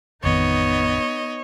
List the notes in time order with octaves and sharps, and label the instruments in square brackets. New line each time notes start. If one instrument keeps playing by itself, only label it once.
[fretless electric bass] A1 F2 D#3 [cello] B3 D#4 [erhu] C#5 [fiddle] D#5